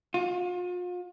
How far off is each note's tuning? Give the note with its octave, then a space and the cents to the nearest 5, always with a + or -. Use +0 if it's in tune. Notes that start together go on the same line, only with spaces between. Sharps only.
F4 +40